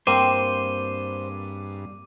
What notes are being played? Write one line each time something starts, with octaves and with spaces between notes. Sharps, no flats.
G2 A#3 C4 A#4 C5 D6 D#7